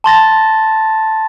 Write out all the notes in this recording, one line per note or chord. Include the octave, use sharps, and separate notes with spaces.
A5 C6 A6 A#6